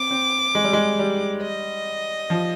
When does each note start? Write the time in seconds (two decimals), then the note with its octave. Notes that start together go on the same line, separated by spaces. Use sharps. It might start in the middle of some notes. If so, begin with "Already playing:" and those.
Already playing: C4 D6
0.11 C4
0.55 G#3
0.64 G3
0.73 G#3
0.99 G3
1.42 D#5
2.30 F3